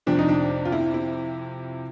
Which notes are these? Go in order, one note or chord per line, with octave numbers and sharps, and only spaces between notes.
F2 C3 F3 D4
D#4
D4
F4
E4
E4